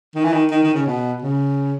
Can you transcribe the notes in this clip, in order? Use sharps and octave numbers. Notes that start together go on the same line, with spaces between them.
D#3
E3
D#3
D#3
D#3
C#3
B2
C#3